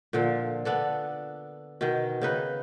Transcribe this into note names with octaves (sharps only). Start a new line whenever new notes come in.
A#2 D3 F3
B3 D4 A4
B2 D#3
C#3 D#4 B4